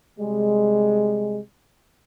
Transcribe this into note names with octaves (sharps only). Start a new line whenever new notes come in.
C3 G3 G#3